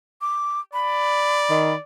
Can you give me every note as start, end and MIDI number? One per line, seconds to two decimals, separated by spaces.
0.21 0.60 86
0.73 1.83 74
0.73 1.75 83
1.50 1.74 51